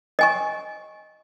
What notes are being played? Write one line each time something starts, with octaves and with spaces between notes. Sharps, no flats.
D#5 G#5 C#6